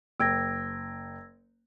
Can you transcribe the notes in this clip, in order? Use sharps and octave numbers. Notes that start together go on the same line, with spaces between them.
F#1 G5 E6 G#6 A#6 D7